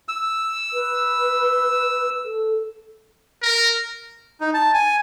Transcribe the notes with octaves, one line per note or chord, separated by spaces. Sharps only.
E6
B4
A4
A#4
D#4
A5
G#5